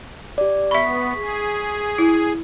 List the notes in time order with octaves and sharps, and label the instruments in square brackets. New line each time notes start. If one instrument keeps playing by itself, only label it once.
[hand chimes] G4 D5
[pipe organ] B3 [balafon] E5 B5 [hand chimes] C#6 B6
[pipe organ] G#4
[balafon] E4